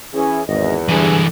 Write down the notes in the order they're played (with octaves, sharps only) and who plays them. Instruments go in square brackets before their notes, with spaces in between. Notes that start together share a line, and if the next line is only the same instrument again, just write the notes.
[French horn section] E3 C#4 [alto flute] G#4
[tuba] G#1 [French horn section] E2 [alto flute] D#5
[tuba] G2 [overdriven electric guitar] D3 E3 [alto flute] G#4